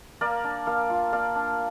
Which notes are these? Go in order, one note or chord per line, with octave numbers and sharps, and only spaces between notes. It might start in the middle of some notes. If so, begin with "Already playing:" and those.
A#3 A#4 D5
D4
A#3 D5 F5
F4
A#3 D5 F5
D4